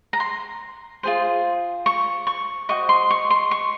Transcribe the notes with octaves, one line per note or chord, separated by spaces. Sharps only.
A#5
C6
F4 G#4 C5
C#6
C#6
F#4 C5 D#5 C#6
C6
C#6
C6
C#6